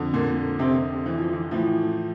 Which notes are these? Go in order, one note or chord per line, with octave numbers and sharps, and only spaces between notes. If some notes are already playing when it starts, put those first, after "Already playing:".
Already playing: F2 D3
A#2 A#3
C3 C4
E3
F3
E3
A2 E3 F3